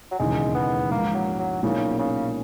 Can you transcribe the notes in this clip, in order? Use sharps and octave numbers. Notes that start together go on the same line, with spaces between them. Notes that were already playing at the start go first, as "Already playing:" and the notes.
F#3
E1 D#2 C#3 E3 G#3
B3
A#1 G#2 E3 A#3
F#3
F#3
B1 A#2 C#3 A#3 C#4 E4
C#3